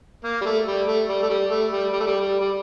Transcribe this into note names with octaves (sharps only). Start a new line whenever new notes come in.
A#3
G3
A3
G3
A3
G3
A3
G3
A3
G3
G3
A3
G3
G3
G3